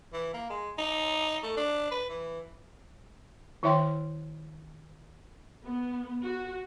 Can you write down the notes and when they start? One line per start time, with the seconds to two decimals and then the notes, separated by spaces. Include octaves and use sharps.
0.13 E3
0.33 A#3
0.50 G#3
0.78 D#4
1.43 A3
1.57 D4
1.91 B4
2.09 E3
3.63 D#3 E4 C#5 E5 G5 C6
5.65 B3
6.24 F#4